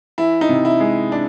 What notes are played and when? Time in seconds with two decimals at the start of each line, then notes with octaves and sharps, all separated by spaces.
0.18 E3 E4
0.41 D#4
0.49 C3
0.65 E4
0.80 G#3
1.12 D4